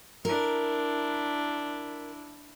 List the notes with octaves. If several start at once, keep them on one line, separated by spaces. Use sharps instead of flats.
D4 E4 A#4